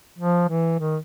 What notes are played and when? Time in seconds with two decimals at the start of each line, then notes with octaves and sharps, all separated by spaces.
0.18 F3
0.48 E3
0.79 D#3